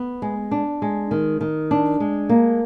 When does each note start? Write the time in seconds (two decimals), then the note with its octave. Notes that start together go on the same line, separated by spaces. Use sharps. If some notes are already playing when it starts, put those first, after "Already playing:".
Already playing: B3
0.22 G#3
0.51 D4
0.82 G#3
1.11 D#3
1.41 D#3
1.71 D4
2.00 G#3
2.29 A#3